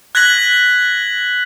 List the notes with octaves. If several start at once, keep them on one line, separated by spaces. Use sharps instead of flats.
F#6 G#6 A#6 B6 F#7